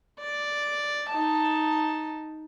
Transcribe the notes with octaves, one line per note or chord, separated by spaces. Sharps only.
D5
D#4 A5